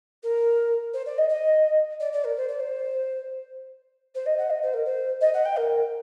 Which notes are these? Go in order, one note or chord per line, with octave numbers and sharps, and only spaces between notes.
A#4
C5
D5
D#5
D#5
D5
D5
A#4
C5
D5
C5
C5
D#5
F#5
D#5
C5
A#4
C5
D#5
F#5
G5
A#4